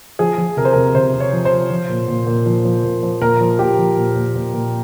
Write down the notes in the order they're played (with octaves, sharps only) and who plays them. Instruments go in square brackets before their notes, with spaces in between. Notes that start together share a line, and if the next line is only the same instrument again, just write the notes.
[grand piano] F3 G#4
F3
C3 A#4
C5
C3 A#4
A#4
C3 C5
C3
C#5
F3
C5
F3
F3
A#2
A#2
A#2
F3
F3
A#2
F3
A#2 A#4
F3
A#2 G4
F3
A#2
A#2
A#2
A#2